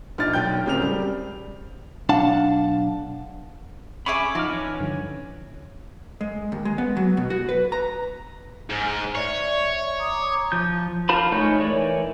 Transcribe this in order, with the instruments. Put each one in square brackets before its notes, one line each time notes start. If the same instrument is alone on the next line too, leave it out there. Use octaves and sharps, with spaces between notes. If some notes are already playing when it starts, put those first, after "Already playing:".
[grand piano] A#1 D4 D#4 F6 A6
B1 G5 G6
D1 C#3 C4 C#4 A#4 F7
G3
[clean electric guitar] B1 D4 F5 F#5 A5
[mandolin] C#4 G#4 E5 [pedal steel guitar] B5 D6
[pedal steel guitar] F3 D6 F6 [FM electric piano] D#4 [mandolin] F#4
[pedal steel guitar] E3 C#4 C#5
[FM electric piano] G2 D3 F3
[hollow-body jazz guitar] G#3
D#2
G#3
B3
F#3
B2
F#4
B4
A#5
[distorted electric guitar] G#2 [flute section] G#5 F6
[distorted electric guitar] C#5 [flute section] D5 E5
[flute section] A#5 D6 D#6
[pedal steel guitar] F3 G6
F4 A#4 C5 A5 B5
G#3 A3 D#4 C#5 G6
E3 A#4 C#5 D5